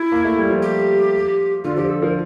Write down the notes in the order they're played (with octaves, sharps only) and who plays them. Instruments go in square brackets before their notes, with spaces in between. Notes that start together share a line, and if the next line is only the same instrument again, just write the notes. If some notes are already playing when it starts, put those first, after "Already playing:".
Already playing: [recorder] E4
[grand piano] A#3
A3
G3
F3
[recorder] G4
[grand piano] D3 [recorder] F4
[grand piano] F3 [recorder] G4
[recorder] A4
[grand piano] F3 [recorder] A#4